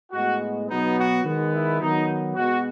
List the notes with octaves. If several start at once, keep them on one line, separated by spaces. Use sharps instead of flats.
A2 G#3 B3 F#4
B2 F#3 B3 D#4
F#4
D#3 G#3 B3
E4
D#3 F#3 B3 D#4
B2 G#3 B3 F#4